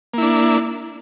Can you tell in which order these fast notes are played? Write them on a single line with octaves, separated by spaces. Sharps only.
A#3 E4 D4